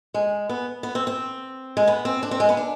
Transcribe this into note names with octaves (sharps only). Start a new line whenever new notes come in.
G#3
B3
B3
C4
C4
G#3
B3
C4
D4
C4
G#3
B3
D4